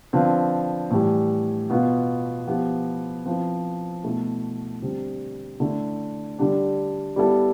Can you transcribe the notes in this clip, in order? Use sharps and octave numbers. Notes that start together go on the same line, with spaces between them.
D3 F3 C4 F4 B4
A2 E3 G3
B2 B3 F4 B4
F3 B3 E4 G4
F3 C4 E4 B4
B2 A3 E4
D3 G3 C4
D3 A3 E4
D3 G3 D4
G3 B3 E4 A4